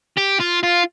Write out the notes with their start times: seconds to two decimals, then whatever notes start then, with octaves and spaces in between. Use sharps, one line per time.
0.18 G4
0.40 F4
0.63 F4